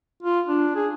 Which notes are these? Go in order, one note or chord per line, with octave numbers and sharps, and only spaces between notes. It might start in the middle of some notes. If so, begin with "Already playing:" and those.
F4
D4
G#4